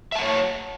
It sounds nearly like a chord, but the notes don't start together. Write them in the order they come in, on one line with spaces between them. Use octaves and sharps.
E5 A5 F#5 C#5